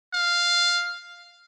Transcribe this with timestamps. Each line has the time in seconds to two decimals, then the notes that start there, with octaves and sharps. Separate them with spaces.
0.14 F5